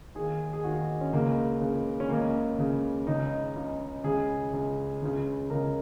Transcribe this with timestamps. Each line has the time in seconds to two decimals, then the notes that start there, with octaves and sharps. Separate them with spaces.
0.15 D#2 D#3 G#4
0.53 G#4
0.64 D#2 D#3 F#4
1.01 C#4
1.13 C#2 C#3 A#3
1.61 C#2 C#3
2.00 C#4
2.09 C#2 C#3 A#3
2.58 C#2 C#3
3.07 C#2 C#3 D#4
3.56 C#2 C#3
4.04 C#2 C#3 G#4
4.53 C#2 C#3
5.02 C#2 C#3
5.50 C#2 C#3 A#4